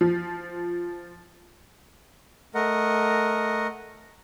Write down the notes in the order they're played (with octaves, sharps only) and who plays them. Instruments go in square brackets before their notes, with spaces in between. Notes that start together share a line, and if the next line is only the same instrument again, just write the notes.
[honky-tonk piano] F3
[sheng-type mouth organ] A3 A#4 D#5 F#5